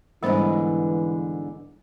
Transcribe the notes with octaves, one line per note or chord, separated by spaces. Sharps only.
G#2 D3 E3 G3 B3 C5